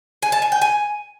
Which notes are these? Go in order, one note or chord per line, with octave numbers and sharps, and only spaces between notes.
G#5
A5
G#5
G5
G#5